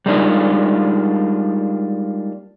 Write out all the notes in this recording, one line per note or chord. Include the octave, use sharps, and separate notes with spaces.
G3 G#3 A#3 D4 D#4 F4